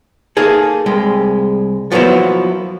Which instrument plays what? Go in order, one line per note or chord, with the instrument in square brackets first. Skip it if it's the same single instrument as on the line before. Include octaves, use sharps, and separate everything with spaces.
[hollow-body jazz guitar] A#3 D#4 G#4 A4
C2 G#3 G4
F3 F#3 A#3 B3 E4 C5